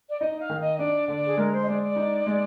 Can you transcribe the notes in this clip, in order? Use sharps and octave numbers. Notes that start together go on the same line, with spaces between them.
D5
D#4 D#5
F5
D#3
D#5
D4 D5
D3 D5
G#4
G#3 A#4
C5
D#5
G#3 D5
D5
D#4
G#3